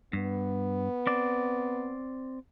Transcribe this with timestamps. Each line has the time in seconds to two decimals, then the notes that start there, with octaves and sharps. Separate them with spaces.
0.13 G2 B3
1.07 C4 D5